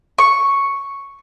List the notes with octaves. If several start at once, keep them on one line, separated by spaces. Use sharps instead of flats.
C#6